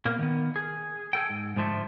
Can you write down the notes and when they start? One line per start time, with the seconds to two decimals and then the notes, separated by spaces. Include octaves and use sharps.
0.05 A#2 A#3 B3
0.19 D#3 B3
0.56 G#4
1.13 G#4 A4 G5
1.30 G#2
1.56 G#2 D3 F3 A3